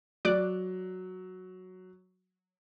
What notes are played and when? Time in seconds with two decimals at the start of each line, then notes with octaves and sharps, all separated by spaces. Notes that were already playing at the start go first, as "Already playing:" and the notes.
0.25 F#3 D5 D6 F#6